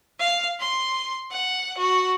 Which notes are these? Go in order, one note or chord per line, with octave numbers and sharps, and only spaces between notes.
F5
C6
F#5
F#4